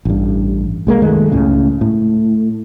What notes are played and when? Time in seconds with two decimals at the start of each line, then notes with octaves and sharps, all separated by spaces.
0.05 A1 G2
0.87 C2 G#3 A#3
1.02 F#2 D#3 G#3 A3
1.32 C#2 A2 C#3
1.81 A2